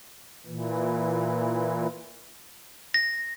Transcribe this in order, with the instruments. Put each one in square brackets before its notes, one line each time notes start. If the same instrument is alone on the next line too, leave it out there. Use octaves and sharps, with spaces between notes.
[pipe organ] A#2 E3
[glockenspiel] A#6